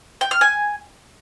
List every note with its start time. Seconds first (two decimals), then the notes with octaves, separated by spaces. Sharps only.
0.21 G5
0.31 F6
0.41 G#5